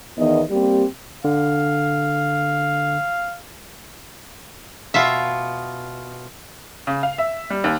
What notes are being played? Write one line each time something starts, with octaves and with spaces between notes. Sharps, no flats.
E2 D#3 E3 B3 D#4 D#5
G3 A#3 C4 G4
D3 F5
B2 F4 E5
C#3
F5
E5
G3
D#2